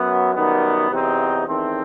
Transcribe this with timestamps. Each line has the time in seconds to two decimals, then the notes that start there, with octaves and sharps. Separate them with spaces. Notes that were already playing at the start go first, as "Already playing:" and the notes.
Already playing: F#2 F#3 B3
0.34 F#2 D#3 G3 B3
0.90 E2 C3 F#3 C4 D#4
1.47 E2 D#3 A3 C4